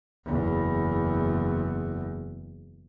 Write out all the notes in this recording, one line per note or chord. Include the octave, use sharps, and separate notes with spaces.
F#1 E2